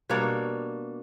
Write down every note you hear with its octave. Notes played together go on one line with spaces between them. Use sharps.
B2 G3 A#3 D4 C#5